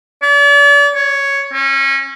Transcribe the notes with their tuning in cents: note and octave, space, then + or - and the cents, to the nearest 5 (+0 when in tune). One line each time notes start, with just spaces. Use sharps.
D5 -40
C#5 +5
C#4 -30